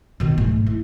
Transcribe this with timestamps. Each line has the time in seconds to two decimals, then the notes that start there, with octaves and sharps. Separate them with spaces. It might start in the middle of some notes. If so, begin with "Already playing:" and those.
0.20 B2 D#3
0.38 G#2 A3
0.67 E4